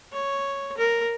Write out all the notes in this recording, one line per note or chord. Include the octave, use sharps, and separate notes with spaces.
C#5
A#4